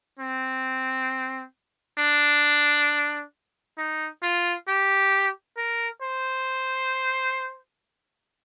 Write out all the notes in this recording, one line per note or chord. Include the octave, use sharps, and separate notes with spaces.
C4
D4
D#4
F4
G4
A#4
C5